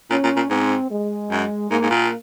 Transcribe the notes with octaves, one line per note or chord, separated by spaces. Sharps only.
A#2 C#4
A#2
A#2
G#2 C4
G#3
F#2
G#2 A#3
G#2
A#2